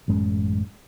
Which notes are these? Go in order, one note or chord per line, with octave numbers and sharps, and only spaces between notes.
A1 F#2 G#3 C#4